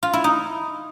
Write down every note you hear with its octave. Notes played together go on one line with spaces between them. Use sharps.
F4
E4
D#4